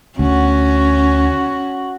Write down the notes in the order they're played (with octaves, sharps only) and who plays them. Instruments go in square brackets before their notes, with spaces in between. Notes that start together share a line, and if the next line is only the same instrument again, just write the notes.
[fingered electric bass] D2 [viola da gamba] C#4 [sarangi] F#4